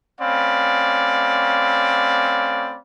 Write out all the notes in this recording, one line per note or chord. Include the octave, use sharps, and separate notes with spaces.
A3 C4 C#4 D5 F5 B5